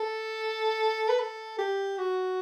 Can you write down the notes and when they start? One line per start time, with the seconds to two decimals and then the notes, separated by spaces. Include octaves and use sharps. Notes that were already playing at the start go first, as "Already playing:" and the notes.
Already playing: A4
1.09 B4
1.20 A4
1.59 G4
1.98 F#4